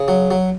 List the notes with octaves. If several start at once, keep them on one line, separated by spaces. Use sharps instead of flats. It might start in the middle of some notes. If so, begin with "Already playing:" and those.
Already playing: C#3
F#3
F#3